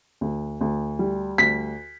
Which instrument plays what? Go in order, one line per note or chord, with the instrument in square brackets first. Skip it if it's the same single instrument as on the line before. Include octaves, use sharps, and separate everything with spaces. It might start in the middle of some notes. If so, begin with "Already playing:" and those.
[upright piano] D2
D2
G3
D2 B6